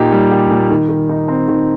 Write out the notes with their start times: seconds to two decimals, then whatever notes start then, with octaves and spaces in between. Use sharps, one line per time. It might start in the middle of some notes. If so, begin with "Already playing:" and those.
Already playing: A#2 D#4 G4
0.12 G3
0.31 G4
0.51 A#2
0.70 D#3
0.89 D#3
1.09 D#4
1.28 C4
1.48 D#3